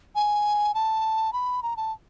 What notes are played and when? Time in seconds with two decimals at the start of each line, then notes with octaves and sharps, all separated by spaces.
0.15 G#5
0.74 A5
1.33 B5
1.63 A#5
1.77 A5